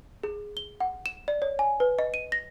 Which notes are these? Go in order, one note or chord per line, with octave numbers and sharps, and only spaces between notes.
G#4
G7
F#5
E7
D5
C#5
G#5
B4
D#5
D#7
A#6